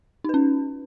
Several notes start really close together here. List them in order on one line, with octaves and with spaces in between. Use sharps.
D#4 B4 C#4